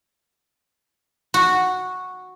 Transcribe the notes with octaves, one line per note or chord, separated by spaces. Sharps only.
F#4